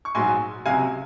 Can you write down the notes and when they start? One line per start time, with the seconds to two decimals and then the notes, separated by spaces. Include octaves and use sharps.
0.05 C#6
0.15 A#1 G#2 F#3 G#5 C6
0.66 C#2 C3 F#3 F5 G#5